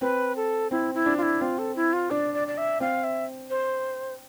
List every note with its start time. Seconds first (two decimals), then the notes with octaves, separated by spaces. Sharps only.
0.01 C4 B4
0.36 A4
0.71 C4 E4
0.94 E4
1.06 D4
1.17 F4
1.22 E4
1.41 C4 F4
1.58 A4
1.76 E4
1.93 F4
2.11 D4 D5
2.34 D5
2.48 D5
2.58 E5
2.80 C4 F5
3.04 E5
3.50 C5